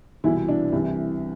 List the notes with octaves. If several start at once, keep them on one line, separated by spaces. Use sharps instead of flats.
C2 B2 E3 E4
D4
C2 C3 E3